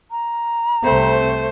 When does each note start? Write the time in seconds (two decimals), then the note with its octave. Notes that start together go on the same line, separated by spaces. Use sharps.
0.11 A#5
0.84 C2 A3 C4 C5